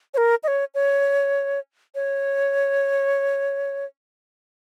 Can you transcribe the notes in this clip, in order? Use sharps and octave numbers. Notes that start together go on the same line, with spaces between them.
C#5
A#4
D#5
C#5
C#5
C#5